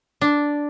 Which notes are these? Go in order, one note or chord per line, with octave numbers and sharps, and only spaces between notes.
D4